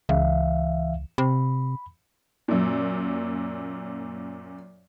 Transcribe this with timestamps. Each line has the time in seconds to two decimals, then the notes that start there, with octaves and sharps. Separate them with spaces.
0.09 C#2 E3 E5 F5
1.18 C3 B5
2.48 F#2 A#2